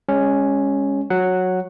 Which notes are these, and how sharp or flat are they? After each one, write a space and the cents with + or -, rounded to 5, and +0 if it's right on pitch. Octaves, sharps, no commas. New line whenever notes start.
G#3 -25 C#4 +0
F#3 -10 F#5 +0